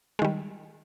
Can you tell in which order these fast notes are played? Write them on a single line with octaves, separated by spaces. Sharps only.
G#3 D#3 G3